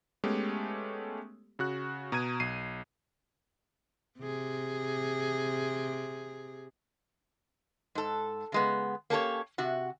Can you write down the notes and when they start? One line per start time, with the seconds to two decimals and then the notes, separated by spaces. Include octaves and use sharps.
0.24 G#3 A3 B3 C#4 G4
1.59 C#3 F#4 F#6
2.12 B2 A#5 D#6 G#6 D#7
2.40 B1 C7 D#7
4.20 C3 G#4
7.95 G#2 A4
8.52 C#3 G#3 B3
9.10 A#3 C#4 G4 A4 B4 C#5
9.58 C3 F#4